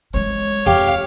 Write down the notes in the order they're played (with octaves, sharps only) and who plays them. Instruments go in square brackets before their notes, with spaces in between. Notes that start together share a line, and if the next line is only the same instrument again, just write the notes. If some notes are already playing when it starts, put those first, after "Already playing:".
[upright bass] G#3 C#4 [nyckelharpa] C#5
[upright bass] F2 [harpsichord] G4 [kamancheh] F5